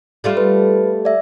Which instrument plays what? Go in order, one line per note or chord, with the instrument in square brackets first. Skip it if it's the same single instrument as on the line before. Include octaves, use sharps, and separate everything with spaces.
[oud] G3 A3 F4
[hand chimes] B4
D5 E5